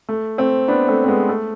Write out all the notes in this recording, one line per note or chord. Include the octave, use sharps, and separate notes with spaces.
A3
A3 C4
B3 D4
A3 C4
C4
G#3 B3
A3